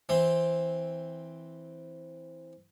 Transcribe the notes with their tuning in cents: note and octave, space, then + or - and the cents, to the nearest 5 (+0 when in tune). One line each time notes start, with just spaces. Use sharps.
E3 -5 C4 +0